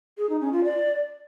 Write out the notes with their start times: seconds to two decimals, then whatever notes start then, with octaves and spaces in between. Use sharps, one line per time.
0.18 G#4
0.29 D#4
0.41 C#4
0.53 F4
0.64 D5